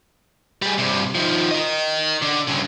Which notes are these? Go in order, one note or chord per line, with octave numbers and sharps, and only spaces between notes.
G3 G#4
G2 C3
D#3 F3
A#4 D#5
D3
G2 C#3